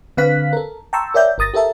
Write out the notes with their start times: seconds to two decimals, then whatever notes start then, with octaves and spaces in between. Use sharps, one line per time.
0.17 D3 C4 B4 F5 F#6 B6
0.53 A4 A#4
0.93 G5 A5 A#5 C6 C#6 E6
1.14 A#4 C#5 D5 E5 G5 G6
1.38 G1 A#4 D#6 A6 A#6
1.54 G4 A4 A#4 E5 A5